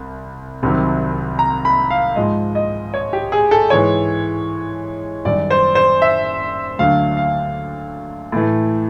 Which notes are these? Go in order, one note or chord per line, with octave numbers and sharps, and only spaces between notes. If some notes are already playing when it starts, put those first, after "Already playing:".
Already playing: C2
C2 C3 D#3 F#3
A#5
B5
F5
G#2 F3 G#3 D#5
D#5
C#5
G4
G#4
A4
G#2 E3 G#3 C#5
F#2 D#3 G3 D5
C5
C5
E5
D2 D3 F#3 A3 F5
F5
A2 E3 A3